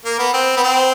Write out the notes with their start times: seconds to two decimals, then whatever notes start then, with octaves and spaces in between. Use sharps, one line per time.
0.05 A#3
0.19 B3
0.34 C4
0.57 B3
0.63 C4